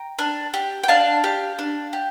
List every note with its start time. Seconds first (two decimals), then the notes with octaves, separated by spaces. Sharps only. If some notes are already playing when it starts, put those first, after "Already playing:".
Already playing: G5 A#5
0.19 D4
0.54 G4
0.84 G5
0.88 D4 F5 A5
1.24 G4
1.59 D4
1.93 G4